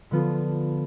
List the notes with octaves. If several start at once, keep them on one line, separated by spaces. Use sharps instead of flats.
D3 F3 B3 F4 A4